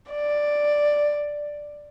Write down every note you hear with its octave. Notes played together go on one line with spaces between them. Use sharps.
D5